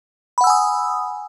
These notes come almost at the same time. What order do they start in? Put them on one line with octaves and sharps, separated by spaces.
B5 F#5 E6 G#5 D#6